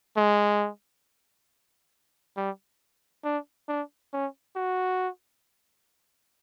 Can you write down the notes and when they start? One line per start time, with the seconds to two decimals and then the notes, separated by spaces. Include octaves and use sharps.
0.17 G#3
2.37 G3
3.25 D4
3.69 D4
4.13 C#4
4.56 F#4